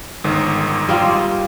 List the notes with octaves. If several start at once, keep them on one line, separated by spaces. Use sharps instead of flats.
G1 G#2 D#3
G3 A#3 F4